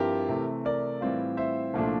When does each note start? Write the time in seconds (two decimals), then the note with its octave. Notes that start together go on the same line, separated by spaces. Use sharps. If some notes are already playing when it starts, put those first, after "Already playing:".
Already playing: G2 F3 C4 E4 G4 A#4
0.29 C3 E3 A3
0.65 A#4 D5
1.01 A2 E3 G3 C4 F4
1.37 C5 E5
1.74 C2 A#2 F3 A3 D4